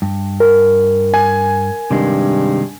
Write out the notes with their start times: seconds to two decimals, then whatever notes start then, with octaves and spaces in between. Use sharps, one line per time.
0.02 G2
0.40 A#4
1.14 G#5
1.91 G2 C3 D#3 G#3